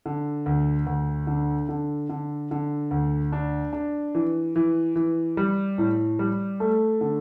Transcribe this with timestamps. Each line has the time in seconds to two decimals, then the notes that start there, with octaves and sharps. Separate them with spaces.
0.06 D3
0.46 D2
0.87 D2
1.27 D3
1.69 D3
2.09 D3
2.51 D3
2.91 D2
3.33 D4
3.73 D4
4.15 E3
4.56 E3
4.96 E3
5.37 G3
5.78 A2
6.19 G3
6.60 A3
7.01 D3